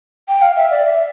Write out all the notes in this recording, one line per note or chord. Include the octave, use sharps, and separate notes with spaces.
G5
F5
E5
D5
E5